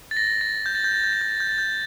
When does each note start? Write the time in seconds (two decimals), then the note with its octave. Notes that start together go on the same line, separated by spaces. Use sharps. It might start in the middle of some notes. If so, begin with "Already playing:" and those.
0.11 A6
0.17 A#6
0.41 A6
0.66 G6
0.75 A6
0.84 G6
0.94 A6
1.04 G6
1.13 A6
1.21 G6
1.31 A6
1.40 G6
1.49 A6
1.58 G6